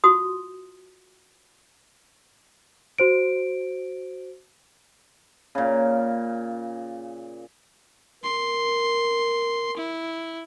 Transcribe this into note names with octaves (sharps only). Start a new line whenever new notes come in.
F4 F#4 C6 D#6
F#4 C5 D7
A#2 C#3
A#4 C6
E4